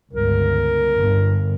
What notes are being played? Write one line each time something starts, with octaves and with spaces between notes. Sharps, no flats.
G1 C#2 A#4
G1